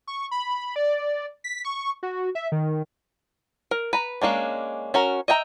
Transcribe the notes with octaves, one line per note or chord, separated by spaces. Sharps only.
C#6
B5
D5
B6
C#6
F#4
E5
D#3
A#4
B4 A#5
G#3 A#3 C#4 D4
C#4 F#4 A#4
D#5 E5 G5 A#5